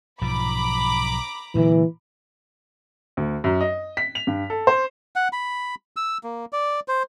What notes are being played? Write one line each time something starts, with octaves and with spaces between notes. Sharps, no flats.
B1 G#2 F3 A#5 B5 D6
A#2 D3 E3 F#3
D2
F#2
D#5
B6
F7
G2
A4
C5
F#5
B5
E6
A#3
D5
C5